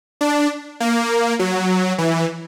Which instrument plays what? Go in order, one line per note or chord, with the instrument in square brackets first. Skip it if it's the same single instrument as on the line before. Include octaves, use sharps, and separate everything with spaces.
[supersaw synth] D4
A#3
F#3
E3